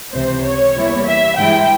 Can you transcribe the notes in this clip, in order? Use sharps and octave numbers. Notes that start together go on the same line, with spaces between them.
C#2 C3 E3 C5
C#5
E2 E3 G3 A#3 E4
E5
G2 E3 G#3 E4 G5